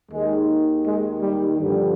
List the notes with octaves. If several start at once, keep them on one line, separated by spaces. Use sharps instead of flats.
D#2 D#3 G#3
G#3
G3
G2 D3 F3 G3